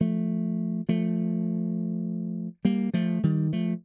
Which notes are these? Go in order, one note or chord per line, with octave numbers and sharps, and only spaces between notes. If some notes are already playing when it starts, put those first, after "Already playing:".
F3 A3
F3 A3
G3 A#3
F3 A3
D#3 G3
F3 A3